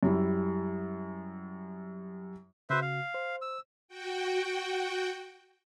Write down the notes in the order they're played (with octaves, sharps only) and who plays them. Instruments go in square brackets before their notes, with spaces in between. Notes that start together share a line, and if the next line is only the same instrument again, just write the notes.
[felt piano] F#2 G3 E4
[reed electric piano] C#3 F#4 [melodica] B4 C5 E5
[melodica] F5
[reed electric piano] C5
[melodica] E6
[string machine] F#4 G5